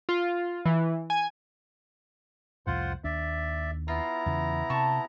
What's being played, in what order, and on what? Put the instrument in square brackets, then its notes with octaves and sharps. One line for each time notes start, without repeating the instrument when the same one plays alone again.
[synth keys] F4
E3
G#5
[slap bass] C2 F2 A2 [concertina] F4 C5 F#5
[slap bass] D#2 D4 [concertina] D5 E5
[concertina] B3 E4 A#5 [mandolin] F4
[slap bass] E2 C#3 E3
[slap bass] C3 [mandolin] A4 A5 C#6